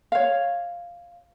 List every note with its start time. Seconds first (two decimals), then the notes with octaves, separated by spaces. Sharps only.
0.12 C#5 F5